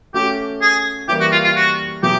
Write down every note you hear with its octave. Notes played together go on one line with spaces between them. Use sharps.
A3 C#4 F#4 G4 A4
G#4
E3 G3 A#3 G4
F#4
F4
F4
F#4
B2 F#3 B3 E4 G4 G#4